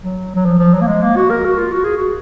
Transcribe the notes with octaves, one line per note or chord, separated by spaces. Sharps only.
F#3
F#3
F3
F3
F#3
A#3
G#3
A#3
F#4
A#4
F#4
F4
F#4
G#4
F#4